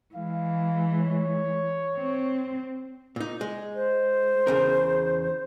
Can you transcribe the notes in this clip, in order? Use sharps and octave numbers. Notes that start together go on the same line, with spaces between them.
E3 G#3 F5
C#5
C4
A#2 D#4
G#3
C5
E2 C#3 A#4